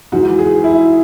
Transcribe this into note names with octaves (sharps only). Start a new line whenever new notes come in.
G#2 E3 F#4
G#4
E4